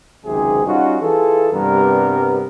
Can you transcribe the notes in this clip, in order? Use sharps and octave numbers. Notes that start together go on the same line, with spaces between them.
G#1 C#2 G#2 C3 F#3 G#4
G3 C#4 D#4 F4 F#4
E3 F4 G#4 A4
G2 C3 G3 B3 A#4